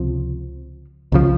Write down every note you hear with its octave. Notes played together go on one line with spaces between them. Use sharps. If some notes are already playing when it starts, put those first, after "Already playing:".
Already playing: C#2 C3 F3
C#2 C#3 F3